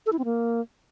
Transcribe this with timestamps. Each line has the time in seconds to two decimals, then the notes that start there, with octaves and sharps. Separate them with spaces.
0.06 A4
0.12 E4
0.19 C4
0.25 A#3